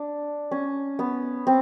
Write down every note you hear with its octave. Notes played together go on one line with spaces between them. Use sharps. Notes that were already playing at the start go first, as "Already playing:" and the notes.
Already playing: D4
C#4
B3
C4